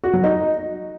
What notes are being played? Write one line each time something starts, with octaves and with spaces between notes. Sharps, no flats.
F#4
F#3
D#4